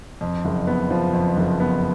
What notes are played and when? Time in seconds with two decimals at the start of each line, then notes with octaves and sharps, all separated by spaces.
0.21 F2
0.45 F#1
0.67 B3
0.90 F3
1.13 F2
1.37 F#1
1.60 B3